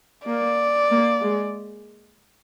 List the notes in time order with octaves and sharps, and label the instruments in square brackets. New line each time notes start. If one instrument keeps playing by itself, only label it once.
[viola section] A#3 [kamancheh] D5
[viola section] A#3
G#3